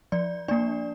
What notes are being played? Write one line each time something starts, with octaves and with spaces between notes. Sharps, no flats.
F3 D5
A#3 D4 D5